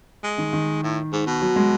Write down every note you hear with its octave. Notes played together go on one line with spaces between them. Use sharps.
G#3
D#3
D#3
A2
G#2
B2
F#3
G#3